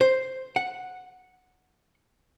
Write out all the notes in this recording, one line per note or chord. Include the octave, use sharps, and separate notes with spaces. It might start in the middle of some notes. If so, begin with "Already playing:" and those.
C5
F#5